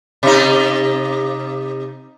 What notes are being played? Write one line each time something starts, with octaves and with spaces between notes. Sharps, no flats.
C3 D#4